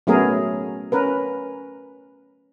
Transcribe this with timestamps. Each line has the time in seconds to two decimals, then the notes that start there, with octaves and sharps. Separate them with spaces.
0.07 F#3 A3 B3 C#4 G#4 A#4
0.92 C#4 A#4 B4